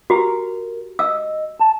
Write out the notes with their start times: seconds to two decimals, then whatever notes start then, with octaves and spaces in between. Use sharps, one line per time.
0.10 F#4 G4 A#4
0.99 D#5 E6
1.59 A5